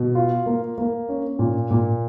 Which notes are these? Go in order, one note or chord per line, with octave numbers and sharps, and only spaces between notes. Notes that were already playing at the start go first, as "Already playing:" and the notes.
Already playing: B2
F4
A#3
A#3
C#4
A#2
A#2